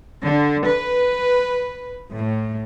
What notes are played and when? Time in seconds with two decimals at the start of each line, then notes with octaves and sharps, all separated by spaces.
0.23 D3
0.67 B4
2.13 A2